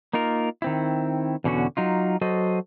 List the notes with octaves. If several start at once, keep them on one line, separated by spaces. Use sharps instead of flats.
A#3 D#4 F4 A#4
D#3 C4 E4
E2 B2 D3 C#4 F#4
F#3 D#4 F4
F#3 F#4 A4 C5 D#5